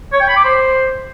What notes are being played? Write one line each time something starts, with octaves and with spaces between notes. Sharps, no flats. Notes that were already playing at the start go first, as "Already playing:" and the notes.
C#5
G5
B5
D6
C5